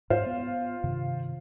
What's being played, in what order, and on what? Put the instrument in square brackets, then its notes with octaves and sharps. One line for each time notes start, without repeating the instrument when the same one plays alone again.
[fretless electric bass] G#2 [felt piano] F4 C5 F5
[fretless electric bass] B3
G2 C3 D#3